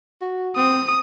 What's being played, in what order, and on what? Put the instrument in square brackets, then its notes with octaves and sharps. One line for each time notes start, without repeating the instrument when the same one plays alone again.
[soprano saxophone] F#4
[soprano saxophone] C4 [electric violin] D#6